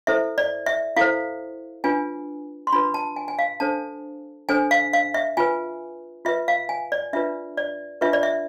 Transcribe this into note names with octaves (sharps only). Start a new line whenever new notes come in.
E4 A4 C5 E5
D5
E5
E4 A4 C5 F5
D4 F4 B4 G#5
C6
D4 F4 B4 B5
A5
G#5
G#5
F5
D4 A4 C5 A5
D4 A4 C5 G#5
F5
F5
E5
F4 B4 G#5
F4 B4 E5
F5
G#5
D5
D4 F4 B4 E5
D5
D4 F4 B4 E5
D5
E5